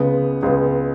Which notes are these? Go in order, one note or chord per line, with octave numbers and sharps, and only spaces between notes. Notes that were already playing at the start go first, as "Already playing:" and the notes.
Already playing: C#2 C#3 G#3 B3
C#2 C#3 G#3 B3